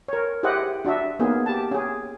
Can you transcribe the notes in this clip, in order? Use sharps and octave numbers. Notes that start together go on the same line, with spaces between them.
A#4 C#5
E4 G4 G#4 C5 D#5 F#5
D4 F#4 D#5 E5
A#3 B3 C#4 D#4 G#4
G4 A5
C#4 G#4